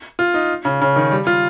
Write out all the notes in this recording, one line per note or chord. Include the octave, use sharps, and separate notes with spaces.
F4
D#4
C#3
C#3
D#3
G3
F4